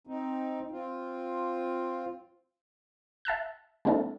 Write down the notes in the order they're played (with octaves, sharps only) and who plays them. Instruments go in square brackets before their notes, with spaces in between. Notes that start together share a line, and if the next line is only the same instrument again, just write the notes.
[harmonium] C4 D#4
C4 F4
[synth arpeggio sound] E5 A5 E6 F#6
G#3 A#3 C4 D4 E4 A4